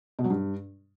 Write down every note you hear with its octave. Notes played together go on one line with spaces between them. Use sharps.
B2
F#3
G2